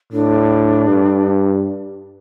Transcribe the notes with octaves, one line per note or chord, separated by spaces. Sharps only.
A2 D4
G2